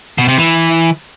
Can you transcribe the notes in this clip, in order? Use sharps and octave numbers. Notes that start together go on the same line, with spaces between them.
B2
C3
E3